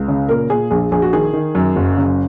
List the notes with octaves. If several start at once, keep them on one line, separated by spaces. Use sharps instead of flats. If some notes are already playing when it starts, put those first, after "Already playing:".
Already playing: C#2
C#3
A#2 A#4
A#2 G#4
A#1 G#4
A#1 G#4
F#4
D#3 G#4
D#3
F#2
F#1
C#3